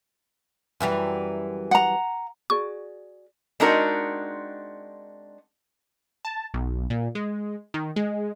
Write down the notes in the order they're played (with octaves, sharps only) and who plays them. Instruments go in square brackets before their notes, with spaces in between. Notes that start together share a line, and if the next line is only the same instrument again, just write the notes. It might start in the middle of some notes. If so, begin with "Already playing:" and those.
[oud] F#2 E3 G3
[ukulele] F#5 A#5
[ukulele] F#4 G#4 D5 [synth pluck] C#6
[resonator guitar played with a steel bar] G#3 C4 D4 D#4 F#4 A#4
[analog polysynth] A5
B1
A#2
G#3
D#3
G#3